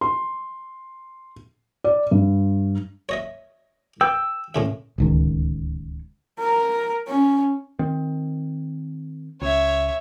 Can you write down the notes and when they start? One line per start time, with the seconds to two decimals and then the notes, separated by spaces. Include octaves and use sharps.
0.01 C6
1.84 D5
2.11 G2
3.09 C#5 D#5 E5
4.01 B4 G5 E6
4.55 A2 C#3 E5
4.98 D1 C#2 D#3
6.39 A#4
7.08 C#4
7.79 D#3 C4
9.42 C#2 C#5 E5